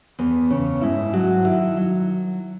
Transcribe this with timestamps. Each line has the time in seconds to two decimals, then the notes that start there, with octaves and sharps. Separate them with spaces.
0.19 E2 B3
0.51 C#3 C#4
0.82 G#2 E4
1.13 F#3 F#4
1.45 D#3 E4
1.77 F#3